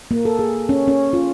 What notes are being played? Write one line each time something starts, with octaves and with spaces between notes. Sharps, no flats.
A#3
A4
G#4
C#4
C#4
F4